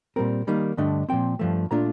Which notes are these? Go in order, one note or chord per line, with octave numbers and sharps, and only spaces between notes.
A#2 G3 C4 A#4
D#3 G3 A#3 D#4
G2 D3 A3 D4 D#5
A#2 F3 C4 G5
G2 F3 A3
A#2 A3 D4 F4 A#5